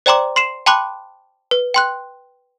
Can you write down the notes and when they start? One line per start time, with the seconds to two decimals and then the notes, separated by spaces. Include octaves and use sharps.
0.06 C5 D5 G5 A#5 C6 D6
0.36 C6 C7 E7
0.66 G5 A5 B5 C6 D6 F#6
1.51 B4
1.74 G5 C6 F#6